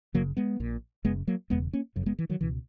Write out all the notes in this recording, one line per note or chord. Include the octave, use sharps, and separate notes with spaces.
F#1 F#2 C#3 F#3 A#3
G#3 B3
A#1 A#2
F#1 F#2 C#3 G#3 B3
F#3 A#3
E1 E2 C#3 G#3 B3
A#3 C#4
F#1 F#2 C#3
G#3 B3
E3
D#3 F#3
C#2 B2 E3